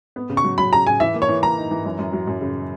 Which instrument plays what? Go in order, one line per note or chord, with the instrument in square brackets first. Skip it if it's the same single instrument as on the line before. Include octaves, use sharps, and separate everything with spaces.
[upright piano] B3
C#3
[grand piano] C#6
[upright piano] F#3
[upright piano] F#3 [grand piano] B5
[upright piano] C#3 [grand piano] A#5
[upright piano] C#3 [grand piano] G#5
[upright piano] E3 [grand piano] E5
[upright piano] A#3
[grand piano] C#5
[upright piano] E3
[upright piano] A#3 [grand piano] A#5
[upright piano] D#4
E3
F#2
F#2
F#3
F#2
C#3